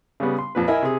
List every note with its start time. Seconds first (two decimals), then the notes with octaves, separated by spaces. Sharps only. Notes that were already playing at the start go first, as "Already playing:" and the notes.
0.20 C#3 G3 B3
0.38 C6
0.55 F2 A#2 B4
0.68 E4 A#4 D#5 E5 G#5 B5
0.82 C3 G#4